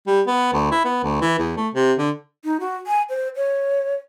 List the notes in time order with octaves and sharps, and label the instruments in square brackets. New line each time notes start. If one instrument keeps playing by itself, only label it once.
[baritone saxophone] G3
B3
D2
E4
B3
D2
E3
E2
A3
C3
D3
[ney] D#4
F#4
G#5
C5
C#5